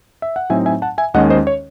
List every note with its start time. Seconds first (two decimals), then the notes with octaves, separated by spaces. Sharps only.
0.22 E5
0.36 F#5
0.50 A2 F#3 C4 D#4 E5 G#5
0.66 E5 G#5
0.82 F#5 A5
0.98 E5 G#5
1.14 D#2 D#3 G#3 C#4 D#5 F#5
1.30 C5 D#5
1.47 C#5